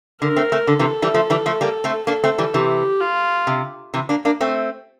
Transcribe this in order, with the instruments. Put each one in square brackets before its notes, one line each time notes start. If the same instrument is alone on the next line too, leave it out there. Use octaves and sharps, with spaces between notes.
[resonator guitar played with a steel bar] D3 [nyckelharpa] A#4
[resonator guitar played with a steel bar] A3 C4
A3 C4
[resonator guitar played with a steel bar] D3 [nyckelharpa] A4
[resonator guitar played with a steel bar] C3 E3
E3 G3
F3 A3
E3 G3
F3 A3
G3 A#3
A3 C4
[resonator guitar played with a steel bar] A#3 D4 [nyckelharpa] A4
[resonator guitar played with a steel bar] A3 C4
E3 G3
[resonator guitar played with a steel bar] C3 E3 [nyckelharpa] G4
[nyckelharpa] F4
[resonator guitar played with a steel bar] C3
C3 E3
A#3 D4
A#3 D4
A3 C4